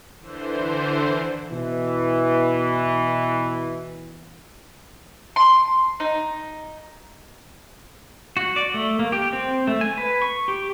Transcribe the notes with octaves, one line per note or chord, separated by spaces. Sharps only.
D3 E3 C5
B2 E3
C6
D#4
F#4
D5
A3
A#3
G4
C4
A3
G#5
B4
C#6
G4